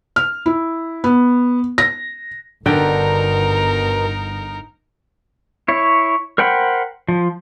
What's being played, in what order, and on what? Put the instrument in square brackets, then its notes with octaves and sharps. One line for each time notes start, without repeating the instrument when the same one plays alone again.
[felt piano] F6
E4
B3
A#6
[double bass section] G1 [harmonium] B2 D#3 [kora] D3 D4 G5 [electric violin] D#4 A#4
[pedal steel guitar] E4 C#5
A#4 C5 F#5 G5 B5
F3